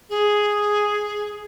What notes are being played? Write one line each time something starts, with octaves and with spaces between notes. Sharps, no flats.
G#4